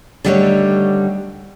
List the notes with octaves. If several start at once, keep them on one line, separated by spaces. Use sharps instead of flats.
D3 D#3 G3 A3 D4 C#5